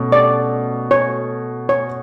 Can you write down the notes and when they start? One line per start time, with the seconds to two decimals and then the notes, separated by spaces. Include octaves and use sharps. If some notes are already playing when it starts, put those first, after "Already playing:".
Already playing: B2 A3 C#4
0.12 D5
0.91 C#5
1.69 C#5